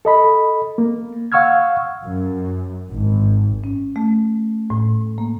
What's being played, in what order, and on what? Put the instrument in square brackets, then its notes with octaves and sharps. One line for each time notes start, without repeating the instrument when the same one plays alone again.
[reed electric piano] A4 D#5 B5
A#3
F5 F#5 C#6 E6 F6 G#6
[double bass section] F#2
G#1
[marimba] C#4
A3
A2
A#3